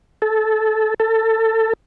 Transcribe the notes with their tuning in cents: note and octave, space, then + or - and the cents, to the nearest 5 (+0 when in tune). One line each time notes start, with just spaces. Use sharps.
A4 -15
A4 +25